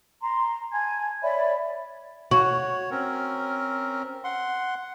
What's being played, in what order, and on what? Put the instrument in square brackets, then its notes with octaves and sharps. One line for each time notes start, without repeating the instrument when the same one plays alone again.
[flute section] A#5 C6
G#5 A5 G#6
C#5 D5 E5 B5
[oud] F#4 [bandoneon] C#5
[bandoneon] C4 C#4 A#4
F#5 C6